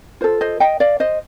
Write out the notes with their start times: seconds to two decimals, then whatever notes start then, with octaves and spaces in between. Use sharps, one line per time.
0.21 F4 A4 C5
0.41 C5 D#5
0.60 D#5 G5
0.80 D5 F5
1.00 C5 D#5